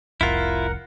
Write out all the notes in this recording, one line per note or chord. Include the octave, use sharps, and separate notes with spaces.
F1 C2 F2 E4 F4 A#4 F#5